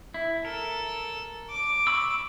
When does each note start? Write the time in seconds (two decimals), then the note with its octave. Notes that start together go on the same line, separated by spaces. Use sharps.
0.14 E4
0.45 A4 A#4
1.50 D6
1.87 B5 C#6 E6